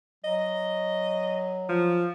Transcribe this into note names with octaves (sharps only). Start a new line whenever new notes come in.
F#3 D#5
F3